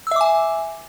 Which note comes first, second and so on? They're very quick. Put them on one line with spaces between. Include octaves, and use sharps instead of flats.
E6 E5 D6 G#5